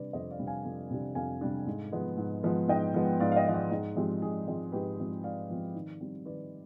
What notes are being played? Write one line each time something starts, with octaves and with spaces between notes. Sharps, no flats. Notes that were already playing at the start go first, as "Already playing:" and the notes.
Already playing: C3 G3 D4 B4 D5
F2 C5 D#5
D5 F5
C3 G3 D4
F5 G#5
F2
C3 G3 D4
F2 F5 G#5
C3 G3 D4
G#2
F3 G#3 B3
G#2
F3 G#3 B3
G#2 D#5 G5
F3 G#3 B3
G#2 D5 F5
F5
D#5 G5
F3 G#3 B3
D5 F5
G#2
F3 G#3 C4 G4
G#2 G#4
F3 G#3 C4
G#2 G4 B4
F3 G#3 C4
G#2 D5 F5
F3 G#3 C4
D#3
G3 C4
D#3 B4 D5